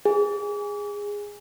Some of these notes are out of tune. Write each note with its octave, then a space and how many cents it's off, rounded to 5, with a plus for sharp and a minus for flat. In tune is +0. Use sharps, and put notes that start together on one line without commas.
G#4 -15